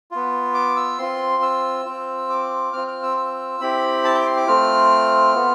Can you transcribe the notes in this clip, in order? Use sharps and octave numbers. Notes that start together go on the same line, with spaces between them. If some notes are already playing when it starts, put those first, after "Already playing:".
B3 F4
D6
E6
C4 F4 C6
E6
C4 F4
D6
C4 F4 F6
F6
E6
E6
C4 E4 G4 B5
A5
G5
D6
C6
D6
A3 C4 F4 F6
B3 F4